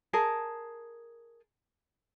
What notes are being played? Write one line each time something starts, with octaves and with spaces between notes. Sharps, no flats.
G#4 A#4 A5